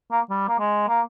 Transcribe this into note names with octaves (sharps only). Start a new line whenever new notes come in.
A#3
G3
A#3
G#3
A#3